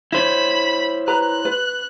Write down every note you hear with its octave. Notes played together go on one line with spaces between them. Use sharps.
E4 C5 C#5 B5
B4 A#5 F#6
B4